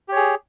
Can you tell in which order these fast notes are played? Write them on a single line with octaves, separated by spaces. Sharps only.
G4 C#5 G#4